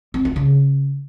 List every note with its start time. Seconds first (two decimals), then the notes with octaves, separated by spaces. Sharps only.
0.14 C4
0.25 F4
0.36 C#3